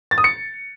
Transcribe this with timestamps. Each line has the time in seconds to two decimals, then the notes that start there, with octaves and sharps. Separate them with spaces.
0.11 A6
0.18 D#6
0.24 C#7